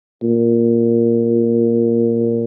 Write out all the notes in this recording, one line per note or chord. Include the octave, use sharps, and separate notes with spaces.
A#2